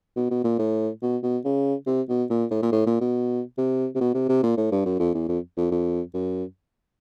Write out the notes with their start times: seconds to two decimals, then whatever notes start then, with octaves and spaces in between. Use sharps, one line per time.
0.16 B2
0.31 B2
0.44 A#2
0.59 A2
1.02 B2
1.23 B2
1.44 C#3
1.87 C3
2.09 B2
2.30 A#2
2.51 A2
2.62 A#2
2.72 A2
2.86 A#2
3.01 B2
3.57 C3
3.95 C3
4.00 B2
4.14 C3
4.28 C3
4.43 A#2
4.57 A2
4.72 G2
4.85 F#2
4.99 F2
5.14 E2
5.28 F2
5.57 F2
5.71 F2
6.14 F#2